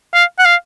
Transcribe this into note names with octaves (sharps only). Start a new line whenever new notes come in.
F5
F#5
F5